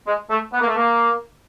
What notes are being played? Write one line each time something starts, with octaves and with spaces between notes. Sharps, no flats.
G#3
A3
B3
A#3
A3
A#3